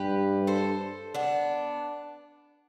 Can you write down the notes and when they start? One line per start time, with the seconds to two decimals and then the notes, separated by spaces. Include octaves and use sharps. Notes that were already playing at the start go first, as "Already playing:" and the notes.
Already playing: G2 G4 B4
0.47 A4 C5
1.15 B3 D4